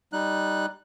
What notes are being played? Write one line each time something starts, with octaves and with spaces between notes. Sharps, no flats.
G3 D#4 F#6